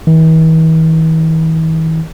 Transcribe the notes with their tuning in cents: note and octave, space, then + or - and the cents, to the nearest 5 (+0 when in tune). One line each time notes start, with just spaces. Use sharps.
E3 -45